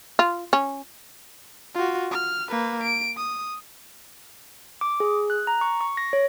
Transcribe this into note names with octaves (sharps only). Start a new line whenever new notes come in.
F4
C#4
F4 F#4
F6
A#3 B4
D7
D#6
D6
G#4
F#6
A#5
C#6
C#6
A#6
C#5